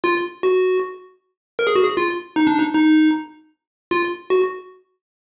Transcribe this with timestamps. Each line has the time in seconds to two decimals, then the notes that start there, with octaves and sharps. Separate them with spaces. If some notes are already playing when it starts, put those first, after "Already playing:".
0.04 F4
0.43 F#4
1.59 A#4
1.67 G#4
1.75 F#4
1.83 G#4
1.97 F4
2.36 D#4
2.47 D4
2.58 D#4
2.74 D#4
3.91 F4
4.30 F#4